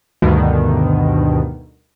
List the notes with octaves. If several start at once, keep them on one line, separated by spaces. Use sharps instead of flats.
D2 G2 B2 D3 D#3